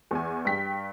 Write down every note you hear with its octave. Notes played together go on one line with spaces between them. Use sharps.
E2 G#5
G2 G5 B6